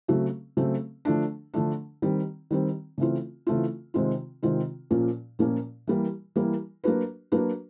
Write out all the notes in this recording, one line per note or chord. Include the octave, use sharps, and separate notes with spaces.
C#3 F#3 A3 C4
C#3 F#3 A3 C4
D3 F3 A3 D4
D3 F3 A3 D4
D#3 G3 C4
D#3 G3 C4
C#3 E3 A3 C4 F4
C#3 E3 A3 C4 F4
C3 D#3 G#3 C4 F4
C3 D#3 G#3 C4 F4
A#2 F3 A#3 C#4
A#2 F3 A#3 C#4
E3 G3 A#3
E3 G3 A#3
F#3 A#3 D4 F#4 B4
F#3 A#3 D4 F#4 B4